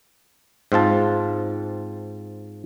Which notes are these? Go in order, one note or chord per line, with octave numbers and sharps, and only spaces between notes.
G#2 C4 F4 A5